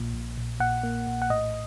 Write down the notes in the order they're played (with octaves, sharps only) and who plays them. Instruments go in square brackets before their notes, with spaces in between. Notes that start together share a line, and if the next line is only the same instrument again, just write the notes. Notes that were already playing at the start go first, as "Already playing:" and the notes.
Already playing: [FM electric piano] A#1 A#2
A#1
A#1
A#2 F#5
A#3
A#1
F#5
A2 D#5